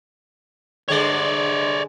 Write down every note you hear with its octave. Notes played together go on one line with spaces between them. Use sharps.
G2 D3 G#3 C#5 D5